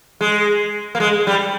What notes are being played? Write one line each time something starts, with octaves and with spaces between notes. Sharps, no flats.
G#3
A#3
G#3
G3